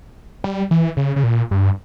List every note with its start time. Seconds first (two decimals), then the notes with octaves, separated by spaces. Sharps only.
0.44 G3
0.71 E3
0.97 C#3
1.16 C#3
1.24 A#2
1.51 G2